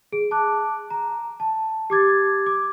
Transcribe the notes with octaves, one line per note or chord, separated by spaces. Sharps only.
G#4 D7
A5 D6 F#6
A#5
A5
G4 D6 G#6 A6
D6